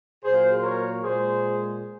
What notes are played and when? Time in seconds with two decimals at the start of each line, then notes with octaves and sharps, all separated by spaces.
0.23 A#2 F#3 A#3 G#4 C5
0.62 A#4 C#5
1.02 A#2 G#3 G#4 C5